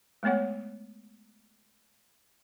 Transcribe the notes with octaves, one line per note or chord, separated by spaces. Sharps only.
G#3 A3 B3 C#5 F#5